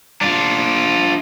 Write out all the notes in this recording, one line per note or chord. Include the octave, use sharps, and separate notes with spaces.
D4 F4